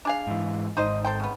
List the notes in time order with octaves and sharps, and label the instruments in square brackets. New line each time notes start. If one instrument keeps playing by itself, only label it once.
[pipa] D4 G#4 F5
[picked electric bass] G#2 E3
[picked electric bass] G#1 G#2 [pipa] D#4 C5 D#5
[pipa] A4 C5 G5
C#3 B3